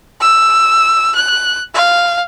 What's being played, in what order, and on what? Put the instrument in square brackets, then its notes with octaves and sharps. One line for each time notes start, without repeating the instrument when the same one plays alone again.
[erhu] E6
F#6
F5